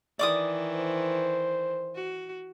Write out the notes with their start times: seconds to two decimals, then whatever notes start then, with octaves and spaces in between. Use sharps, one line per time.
0.19 D#3 E3 D5 D6 D#6
0.75 C5
1.95 F#4